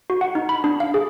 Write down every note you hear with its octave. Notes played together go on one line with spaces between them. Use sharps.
F#4
F#5
D#4
B5
D4
F5
G#4